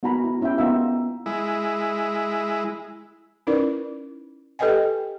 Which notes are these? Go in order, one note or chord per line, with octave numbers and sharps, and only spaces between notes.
B3 D#4 F#4 G#5 A#5 B5
E4
C#4 E4 G4 E5 G5
B3 D#4 F4 E5
G#3 E4
C#4 D#4 E4 A#4 B4 D5
G4 A4 B4 D#5 G5 G#5